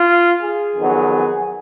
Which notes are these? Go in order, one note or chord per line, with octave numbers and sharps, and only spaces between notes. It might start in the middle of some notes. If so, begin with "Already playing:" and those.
Already playing: F4
G#4
F2 D#3 F#3 B3